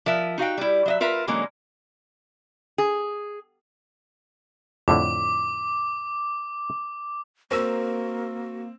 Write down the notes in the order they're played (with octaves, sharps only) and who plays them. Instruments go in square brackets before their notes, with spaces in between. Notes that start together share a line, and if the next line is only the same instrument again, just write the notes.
[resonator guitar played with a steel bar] F3 A#4 E5
D#4 F#4 F5 G5
G3 E4
F#3 D#5 E5
F4 A#4 B4 E5
D3 F#3 G#3 A#3 C#4
G#4
[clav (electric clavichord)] F2 A2 D3 [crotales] D6
[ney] A#3 [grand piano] C4 [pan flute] F#4 [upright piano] A#4 E6